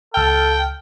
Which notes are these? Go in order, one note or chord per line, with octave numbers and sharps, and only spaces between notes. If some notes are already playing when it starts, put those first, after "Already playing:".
C#2 A4 G5 F6